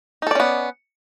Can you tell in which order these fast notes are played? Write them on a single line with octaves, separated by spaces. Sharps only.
D#4 A4 D5 C#4 B3